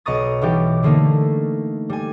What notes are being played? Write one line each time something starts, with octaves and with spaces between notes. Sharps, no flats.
B1 D#5 A#5 C#6 D#6 A6
B2 E3 G3 D#4 G4
D3 A3 A#3 D#4
G3 G#5